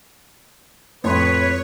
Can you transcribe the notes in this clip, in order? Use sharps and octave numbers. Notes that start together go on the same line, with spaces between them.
F2 A2 B4 C#5 C6